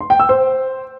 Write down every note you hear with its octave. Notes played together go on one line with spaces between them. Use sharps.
C6
G5
E6
C5